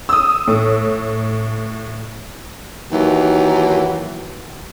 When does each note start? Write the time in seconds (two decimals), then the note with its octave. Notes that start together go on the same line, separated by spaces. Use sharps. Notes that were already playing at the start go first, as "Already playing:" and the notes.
0.09 D#6 E6
0.47 A2
2.92 D#2 D#3 E3 F#3